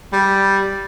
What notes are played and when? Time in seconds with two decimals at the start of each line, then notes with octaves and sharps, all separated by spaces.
0.12 G3